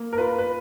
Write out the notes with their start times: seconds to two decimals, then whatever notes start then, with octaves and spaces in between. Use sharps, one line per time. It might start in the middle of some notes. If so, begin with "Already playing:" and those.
Already playing: A#3
0.13 A#4
0.18 F4 B4
0.39 B4